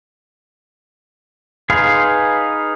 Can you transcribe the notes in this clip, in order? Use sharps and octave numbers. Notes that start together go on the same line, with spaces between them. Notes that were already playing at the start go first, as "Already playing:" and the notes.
D#4 G#4 B4 F5 C6